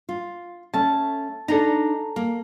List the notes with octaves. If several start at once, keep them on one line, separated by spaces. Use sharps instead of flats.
F4
A3 C#4 A5
D4 D#4 A4 A#5
A#3